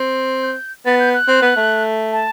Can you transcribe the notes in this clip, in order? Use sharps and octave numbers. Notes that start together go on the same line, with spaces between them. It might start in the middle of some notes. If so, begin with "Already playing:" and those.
Already playing: C4
G6
B3 A6
G6
F#6
C4
B3
A3
A5